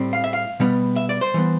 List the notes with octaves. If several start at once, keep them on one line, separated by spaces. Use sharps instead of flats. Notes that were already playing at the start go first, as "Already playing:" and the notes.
Already playing: A2 G3 C4
F5
E5
F5
B2 G3 B3
E5
D5
C5
E3 G3 B3